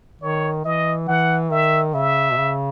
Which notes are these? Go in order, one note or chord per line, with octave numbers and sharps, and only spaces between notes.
D#3 C#5
E3 D#5
E3 F#5
D#3 E5
C#3 E5
B2
C#3